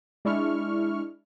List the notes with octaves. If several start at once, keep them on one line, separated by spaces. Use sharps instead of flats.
G#3 D4 E4 C#6 F6